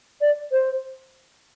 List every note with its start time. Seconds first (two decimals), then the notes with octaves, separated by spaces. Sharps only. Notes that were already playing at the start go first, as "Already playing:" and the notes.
0.21 D5
0.52 C5